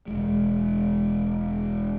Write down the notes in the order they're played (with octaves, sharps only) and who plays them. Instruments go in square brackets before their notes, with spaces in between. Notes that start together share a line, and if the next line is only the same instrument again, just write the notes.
[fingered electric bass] E1 G#3